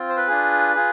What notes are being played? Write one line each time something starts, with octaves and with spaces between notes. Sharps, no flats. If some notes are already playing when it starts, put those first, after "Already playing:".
Already playing: C4 F4
C5
B4
D4 F4 G#4
F4 G#4